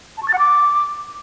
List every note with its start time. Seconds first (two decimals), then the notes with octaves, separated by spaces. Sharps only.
0.17 A5
0.23 C#6
0.28 A6
0.33 F#5
0.39 D6